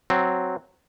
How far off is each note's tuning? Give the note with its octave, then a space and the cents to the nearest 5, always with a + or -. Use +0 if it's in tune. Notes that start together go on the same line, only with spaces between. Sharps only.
F#3 +0 C4 +0